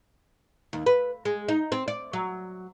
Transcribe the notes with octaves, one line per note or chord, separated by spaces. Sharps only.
D#2
B4
G#3
D#4
C4
D5
F#3